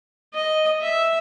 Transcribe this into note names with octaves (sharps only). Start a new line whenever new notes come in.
D#5
E5